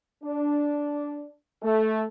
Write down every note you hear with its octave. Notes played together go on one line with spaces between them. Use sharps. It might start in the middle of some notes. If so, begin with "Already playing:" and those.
D4
A3